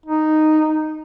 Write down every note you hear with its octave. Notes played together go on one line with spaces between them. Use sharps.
D#4